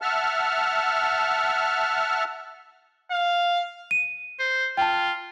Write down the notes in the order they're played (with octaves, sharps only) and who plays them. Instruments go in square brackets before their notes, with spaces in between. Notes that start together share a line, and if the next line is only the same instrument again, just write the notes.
[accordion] E5 F#5 A5 F6
[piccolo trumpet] F5
[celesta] D#7
[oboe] C5
[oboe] F4 [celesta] G5 A5